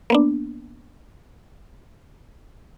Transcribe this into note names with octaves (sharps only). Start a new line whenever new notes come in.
A#3 B3 D4